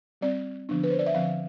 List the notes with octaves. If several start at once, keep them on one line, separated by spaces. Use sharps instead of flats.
G3 C4 D5
D3 F3 B3 D4
B4
C5
D5
E5
D3 F3 C4 F5